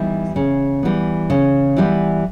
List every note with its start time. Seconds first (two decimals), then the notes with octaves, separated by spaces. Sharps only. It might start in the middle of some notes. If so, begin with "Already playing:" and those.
Already playing: E3 G3 B3 D#4
0.36 C#3
0.83 E3 G3 B3
1.30 C#3
1.77 E3 G3 B3